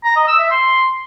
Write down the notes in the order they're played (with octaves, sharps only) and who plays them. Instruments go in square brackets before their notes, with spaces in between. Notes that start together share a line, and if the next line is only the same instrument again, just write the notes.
[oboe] A#5
D#5
E6
E5
C6